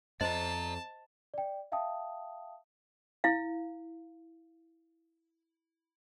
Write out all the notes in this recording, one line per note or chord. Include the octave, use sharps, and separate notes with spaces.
F2 C5 D5 D#5 A5 A#5
D5 G5
E5 F5 G5 A5 D#6
E4 F5